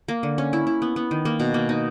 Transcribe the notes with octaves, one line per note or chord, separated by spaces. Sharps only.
A#3
D3
C#4
E4
E4
B3
B3
D#3
A#3
B2
A#3
D#4